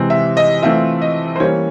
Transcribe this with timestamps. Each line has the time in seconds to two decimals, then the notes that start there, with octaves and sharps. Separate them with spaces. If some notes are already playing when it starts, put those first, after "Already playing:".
Already playing: C3 E3 G#3 C4
0.10 E5
0.37 D#5
0.62 E3 A3 C4 F4 E5
1.02 D#5
1.36 C5
1.40 E3 G3 A#3 C#4 C#5